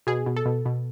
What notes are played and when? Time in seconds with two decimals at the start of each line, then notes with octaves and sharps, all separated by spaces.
0.07 B2 G#4
0.26 B2
0.36 A4
0.46 B2
0.65 B2